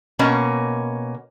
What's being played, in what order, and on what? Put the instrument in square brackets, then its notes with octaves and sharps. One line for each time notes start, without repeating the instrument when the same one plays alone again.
[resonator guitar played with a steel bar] B2 A#3 C#4